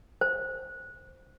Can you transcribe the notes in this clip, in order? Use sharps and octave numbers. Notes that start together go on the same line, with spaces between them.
C5